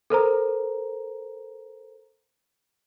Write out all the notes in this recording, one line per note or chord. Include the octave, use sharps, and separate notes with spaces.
A4 A#4 C5 A#5